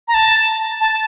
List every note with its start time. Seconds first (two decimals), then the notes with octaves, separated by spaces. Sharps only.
0.08 A#5
0.14 A5
0.80 A5